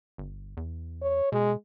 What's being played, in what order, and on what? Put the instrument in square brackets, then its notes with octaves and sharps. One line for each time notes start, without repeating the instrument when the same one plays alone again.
[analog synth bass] G1
E2
[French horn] C#5
[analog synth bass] B2 [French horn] G#3